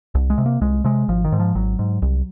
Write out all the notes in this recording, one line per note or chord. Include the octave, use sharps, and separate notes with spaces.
C2
G#3
C3
A#3
C2 G#3
C3 G#3
G#1 F3
D#3
G#2
F3
G#1 F#3
G#2
C2